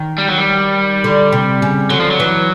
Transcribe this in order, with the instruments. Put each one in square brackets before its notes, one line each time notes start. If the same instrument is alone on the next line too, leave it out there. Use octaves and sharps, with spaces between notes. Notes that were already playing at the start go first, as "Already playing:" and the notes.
Already playing: [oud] D#3
[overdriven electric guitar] G3
F#3
G3
[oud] D3
C3
C#3
[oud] D3 [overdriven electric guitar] F#3
[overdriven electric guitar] F3
F#3
[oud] E3